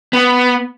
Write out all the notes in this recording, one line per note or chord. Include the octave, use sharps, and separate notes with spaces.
B3